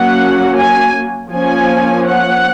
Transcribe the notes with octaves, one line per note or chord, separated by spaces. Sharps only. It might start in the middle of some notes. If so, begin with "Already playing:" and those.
Already playing: F#3 A#3 C#4 F#5
G#5
F3 A#3 C#4 G#5
F#5